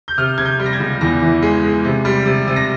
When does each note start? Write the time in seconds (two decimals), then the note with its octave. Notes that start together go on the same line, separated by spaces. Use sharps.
0.08 G6
0.18 C3 F6
0.38 C3 G#6
0.45 G6
0.59 G3
0.66 A#6
0.73 G#6
0.80 C#2
1.01 E2 A#6
1.22 E3
1.42 G#3
1.63 G#3
1.84 C3
2.05 G3
2.26 C3
2.47 C3
2.56 A#6